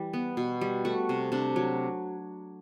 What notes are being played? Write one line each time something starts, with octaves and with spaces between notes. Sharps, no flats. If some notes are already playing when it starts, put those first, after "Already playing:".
Already playing: E3 G3
B3
B2
G3
A3 F#4
C3
C3 D4
F#3